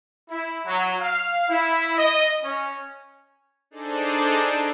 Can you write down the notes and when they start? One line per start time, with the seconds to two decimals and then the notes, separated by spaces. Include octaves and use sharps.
0.30 E4
0.65 F#3
1.01 F5
1.48 E4
1.97 D#5
2.43 C#4
3.71 D4 D#4 G#4 A4 C5 D5